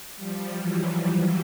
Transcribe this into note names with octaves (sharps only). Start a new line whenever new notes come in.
F3 G3
E3 F#3